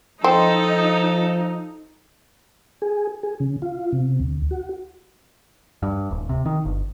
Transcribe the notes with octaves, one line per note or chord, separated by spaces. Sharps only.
F3 C4 D#4 A4
G#4
G#4
C#3
F4
C3
D2
F#4
G2
D1
C3
D#3
G1